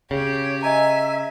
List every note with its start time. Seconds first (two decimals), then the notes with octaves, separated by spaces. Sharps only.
0.11 C#3 G4 C#5
0.63 D#5 E5 G#5 A#5